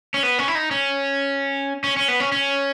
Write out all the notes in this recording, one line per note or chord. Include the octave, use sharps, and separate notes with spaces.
C#4
B3
C#4
E4
D#4
C#4
C#4
C#4
B3
C#4
C#4